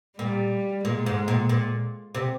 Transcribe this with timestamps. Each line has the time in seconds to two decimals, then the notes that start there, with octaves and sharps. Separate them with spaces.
0.18 A#2 G3
0.84 A#2 G#3
1.06 G#2
1.28 A#2
1.49 A#2
2.15 C3